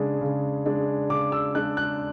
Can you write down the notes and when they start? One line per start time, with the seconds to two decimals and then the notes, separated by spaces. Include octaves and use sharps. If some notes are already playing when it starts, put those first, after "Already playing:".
Already playing: C#3 G#3 D4
0.21 C#3
0.66 G#3 D4
1.10 C#3 D6
1.32 E6
1.55 G#3 D4 F#6
1.77 F#6